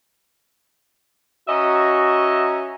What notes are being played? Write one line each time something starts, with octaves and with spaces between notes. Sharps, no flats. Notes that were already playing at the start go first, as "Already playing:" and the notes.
C#4 F#4 D#5 E5 A#5